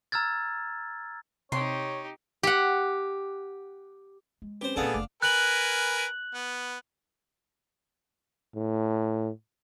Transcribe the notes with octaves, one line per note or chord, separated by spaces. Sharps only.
A#5 E6 F6 G#6 A6
C3 D#4 G4 C#5 C6
G4 F#5
G#3
C4 C#4 G4 B4 C5
E2 A#2 B3 D4 G#4 A4 F5 F#5
F#1 A3 D6
A#4 B4 G#5 F#6 F#7
B3
A2